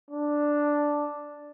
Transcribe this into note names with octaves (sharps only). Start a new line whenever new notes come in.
D4